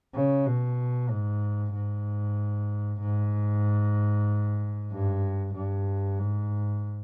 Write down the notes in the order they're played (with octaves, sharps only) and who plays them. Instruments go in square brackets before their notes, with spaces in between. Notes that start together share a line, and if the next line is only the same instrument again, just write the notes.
[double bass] C#3
B2
G#2
G#2
G#2
G2
G2
G#2